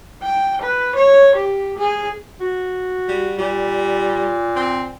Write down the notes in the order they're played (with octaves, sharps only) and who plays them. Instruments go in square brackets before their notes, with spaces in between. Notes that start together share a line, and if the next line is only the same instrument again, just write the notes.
[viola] G5
B4
C#5
G4
G#4
[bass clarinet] F#4
[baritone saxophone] G3
[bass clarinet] A#2 [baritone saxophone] G3
[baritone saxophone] C4